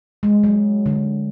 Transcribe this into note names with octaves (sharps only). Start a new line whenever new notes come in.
G#3
F#3
D3